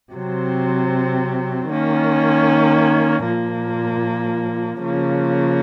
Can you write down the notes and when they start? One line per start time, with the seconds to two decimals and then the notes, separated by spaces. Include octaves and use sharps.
0.12 C3 F#3 C4
1.69 D#3 A#3 C#4
3.25 A#2 F3 A#3
4.81 C#3 F3 A#3